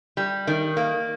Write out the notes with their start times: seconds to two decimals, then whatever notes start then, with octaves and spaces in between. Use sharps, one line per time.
0.17 G3
0.47 D#3
0.77 A#3